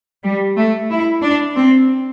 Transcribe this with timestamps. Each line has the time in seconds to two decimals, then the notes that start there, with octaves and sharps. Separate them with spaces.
0.24 G3
0.57 A3
0.91 E4
1.23 D4
1.56 C4